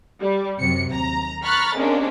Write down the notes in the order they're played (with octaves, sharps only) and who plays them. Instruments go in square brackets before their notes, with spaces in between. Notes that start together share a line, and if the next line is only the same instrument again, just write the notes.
[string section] G3
F#2 C3 F#3 C#7
D#2 A#5
A#5 B5 C#6 F6 F#6 A6
C3 G#3 A#3 C#4 D4